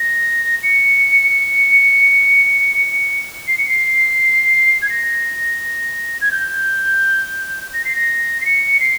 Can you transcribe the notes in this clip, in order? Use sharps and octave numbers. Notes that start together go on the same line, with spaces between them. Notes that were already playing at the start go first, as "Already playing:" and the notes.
Already playing: A#6
C#7
C7
C#7
C7
G#6
A#6
G#6
G6
A#6
C7
A#6
C7
C#7
C7